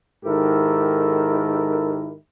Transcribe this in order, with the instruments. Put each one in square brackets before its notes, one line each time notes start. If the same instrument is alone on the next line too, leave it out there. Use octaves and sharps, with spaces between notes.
[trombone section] G#2 D#3 E4 G4 A4 A#4